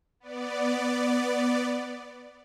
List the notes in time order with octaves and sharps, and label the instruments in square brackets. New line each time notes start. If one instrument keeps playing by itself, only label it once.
[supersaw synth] B3 D5